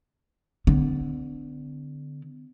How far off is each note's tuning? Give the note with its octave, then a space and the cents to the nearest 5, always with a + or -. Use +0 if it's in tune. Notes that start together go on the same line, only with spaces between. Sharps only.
D3 +0 B3 +45